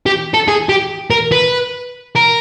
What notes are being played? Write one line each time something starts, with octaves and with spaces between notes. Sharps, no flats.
G4
A4
G#4
G4
A#4
B4
A#4